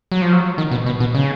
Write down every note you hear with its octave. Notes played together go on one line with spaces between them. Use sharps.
F#3
F3
F#3
D#3
B2
B2
B2
C#3